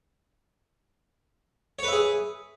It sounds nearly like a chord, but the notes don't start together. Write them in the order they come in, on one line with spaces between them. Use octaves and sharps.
C#5 B4 E5 G#4